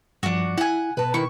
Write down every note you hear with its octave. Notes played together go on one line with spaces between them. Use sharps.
G2 F3 D4 F#4
E4 F#5 G#5
B2 B4 A5
D#3 E4 C#6